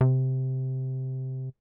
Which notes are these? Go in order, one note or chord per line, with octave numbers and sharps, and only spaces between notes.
C3